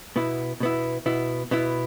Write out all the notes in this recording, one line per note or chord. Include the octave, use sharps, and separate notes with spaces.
B2 B3 E4
B2 B3 E4
B2 B3 E4
B2 B3 E4